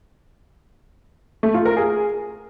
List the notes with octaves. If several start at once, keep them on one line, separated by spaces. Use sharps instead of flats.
A3
F4
A#4
G#4